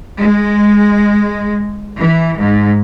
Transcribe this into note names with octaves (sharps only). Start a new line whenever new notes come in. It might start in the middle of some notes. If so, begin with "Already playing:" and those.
G#3
E3
G#2